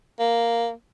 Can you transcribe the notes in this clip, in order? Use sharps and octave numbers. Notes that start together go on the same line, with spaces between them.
A#3